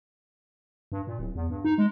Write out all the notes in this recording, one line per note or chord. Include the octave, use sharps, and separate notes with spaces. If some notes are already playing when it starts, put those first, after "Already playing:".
G2
A#2
D1
E2
G2
D#4
G#3